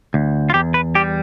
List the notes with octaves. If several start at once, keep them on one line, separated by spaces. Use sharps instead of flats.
D2
F4
E2 G4
B4
G3 G4